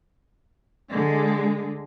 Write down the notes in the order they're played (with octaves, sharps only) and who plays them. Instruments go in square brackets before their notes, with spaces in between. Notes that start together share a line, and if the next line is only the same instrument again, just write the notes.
[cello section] D3 G#3